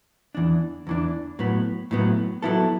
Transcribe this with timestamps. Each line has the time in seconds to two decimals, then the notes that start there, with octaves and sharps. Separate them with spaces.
0.35 E2 E3 D4
0.87 E2 E3 D4
1.39 A2 F#3 B3
1.91 A2 F#3 B3
2.42 F#3 B3 E4 A4